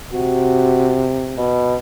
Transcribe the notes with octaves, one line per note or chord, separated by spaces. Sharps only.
C3 F#4
B2